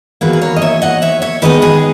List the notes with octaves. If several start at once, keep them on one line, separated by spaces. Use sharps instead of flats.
E2 D#3 F#3 A#3 G#4 B4
B4
A#4 C#5
D#5
C#5 E5
D#5 F#5
C#5 E5
C#5 E5
D#3 G#3 B3 D#4 B4 D#5
G#4 B4